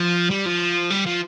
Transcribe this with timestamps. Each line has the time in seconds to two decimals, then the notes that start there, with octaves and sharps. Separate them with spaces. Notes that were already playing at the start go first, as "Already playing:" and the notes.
Already playing: F3
0.30 G3
0.46 F3
0.90 G3
1.06 F3